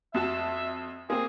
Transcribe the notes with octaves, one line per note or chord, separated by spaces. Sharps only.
F2 F#4 E5 A5
A#3 C4 G#4